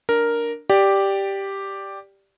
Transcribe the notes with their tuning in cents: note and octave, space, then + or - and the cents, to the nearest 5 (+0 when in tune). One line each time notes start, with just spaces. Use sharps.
D4 +0 A#4 +0
G4 +0 D5 +0